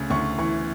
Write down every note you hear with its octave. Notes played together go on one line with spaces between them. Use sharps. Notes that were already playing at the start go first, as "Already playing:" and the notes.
Already playing: D2 C#3
D2 C#6
E3 C#6